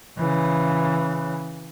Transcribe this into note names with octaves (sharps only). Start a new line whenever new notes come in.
C#3 E3